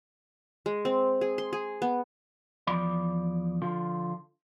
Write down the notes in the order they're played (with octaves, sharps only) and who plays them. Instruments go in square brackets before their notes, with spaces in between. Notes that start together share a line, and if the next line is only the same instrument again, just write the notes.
[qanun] G#3
C4
G#4
C6
G#4
B3
[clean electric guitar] E2 F3 D5 B5
D3 F3 F4